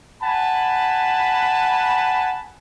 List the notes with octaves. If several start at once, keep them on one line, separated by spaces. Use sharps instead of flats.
F#5 G#5 A5 B5